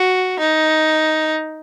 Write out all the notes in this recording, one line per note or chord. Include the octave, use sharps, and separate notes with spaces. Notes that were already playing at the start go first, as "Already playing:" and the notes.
Already playing: F#4
D#4